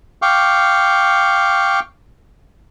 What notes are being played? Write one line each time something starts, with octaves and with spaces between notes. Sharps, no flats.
F5 G5 C#6 D6